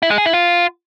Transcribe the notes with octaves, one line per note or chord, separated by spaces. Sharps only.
E4
G#3
G#4
E4
F4